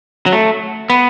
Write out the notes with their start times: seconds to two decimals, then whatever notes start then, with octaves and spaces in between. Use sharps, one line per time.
0.26 F#3
0.32 A3
0.90 B3